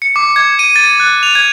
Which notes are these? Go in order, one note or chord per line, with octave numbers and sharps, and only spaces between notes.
C#7
D6
G#6
D#7
A6
F#6
F7
G#6